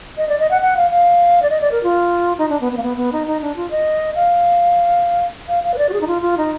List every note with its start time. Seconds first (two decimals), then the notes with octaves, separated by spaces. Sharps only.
0.17 D#5
0.29 D5
0.39 D#5
0.51 F#5
0.61 F#5
0.77 F5
0.91 F5
1.42 D5
1.50 D#5
1.61 D5
1.71 A#4
1.83 F4
2.38 D#4
2.49 D4
2.61 B3
2.72 B3
2.77 A#3
2.83 B3
2.97 B3
3.12 D#4
3.27 D#4
3.41 D4
3.56 F4
3.71 D#5
4.15 F5
5.48 F5
5.63 F5
5.74 B4
5.78 D5
5.89 F#4
5.93 G#4
6.01 D#4
6.07 F4
6.22 F4
6.38 D#4